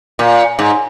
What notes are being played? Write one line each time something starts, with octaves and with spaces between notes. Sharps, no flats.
A#2
G#2